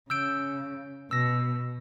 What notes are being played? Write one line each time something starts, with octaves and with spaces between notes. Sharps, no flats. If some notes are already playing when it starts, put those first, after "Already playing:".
C#3 E6 G6 D7
B2 E6 A#6